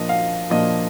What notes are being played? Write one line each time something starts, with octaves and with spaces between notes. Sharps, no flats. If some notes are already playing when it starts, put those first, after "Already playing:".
Already playing: A#2 F3 A#3 D4 D#5
F5
A#2 F3 A#3 D4 D#5